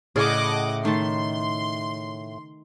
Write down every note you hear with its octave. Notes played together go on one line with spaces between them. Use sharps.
A2 C#3 E4 G#4 D5 D#5 F#5 D6
D#3 A3 A5 C6